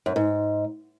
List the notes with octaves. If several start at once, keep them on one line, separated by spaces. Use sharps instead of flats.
F#2
G#2